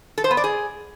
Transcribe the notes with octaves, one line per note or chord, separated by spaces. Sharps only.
A4
C5
B3
D5
G#4